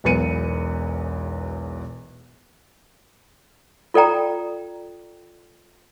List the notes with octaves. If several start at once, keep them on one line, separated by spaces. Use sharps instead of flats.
E1 B1 E2 B4 C#7 D#7
F4 A4 D5 G5 A#5